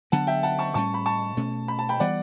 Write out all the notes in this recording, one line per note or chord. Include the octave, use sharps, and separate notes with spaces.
D3 F#3 B3 F#5 A5
E5 G5
F#5 A5
A5 C#6
A2 G3 C#4 A5 C#6
B5
A5 C#6
B2 A3 C#4
B5
A5
G5 B5
E3 G3 B3 D5 F#5